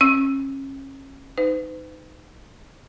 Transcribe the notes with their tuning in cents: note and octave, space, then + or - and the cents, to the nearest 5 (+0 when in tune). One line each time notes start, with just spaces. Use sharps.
C#4 -30 E6 +0
D#4 +0 B4 +45